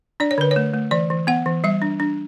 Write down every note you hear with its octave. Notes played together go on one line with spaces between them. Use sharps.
D4 D5
C#5
D3 B4
C#5
A3
A3
E3 D5
E3
B3 F#5
E3
G3 E5
D4
D4